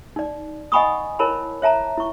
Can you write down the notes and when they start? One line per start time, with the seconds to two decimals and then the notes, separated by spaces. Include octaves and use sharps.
0.16 D#4 D5
0.72 D#5 F#5 G#5 B5 C#6 D#6
1.19 E4 A#4 C#5 A5 B5
1.62 C#5 E5 A5 A#5
1.98 E4 C#6